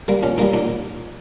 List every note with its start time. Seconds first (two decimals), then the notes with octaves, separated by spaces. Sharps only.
0.08 G3 A#3
0.23 A#2 C#4
0.38 G3 A#3 D#4
0.53 A#2 D#4